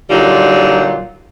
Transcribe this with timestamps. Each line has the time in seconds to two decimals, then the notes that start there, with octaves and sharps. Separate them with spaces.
0.09 A#2 D3 F#3 G3 D#4 F4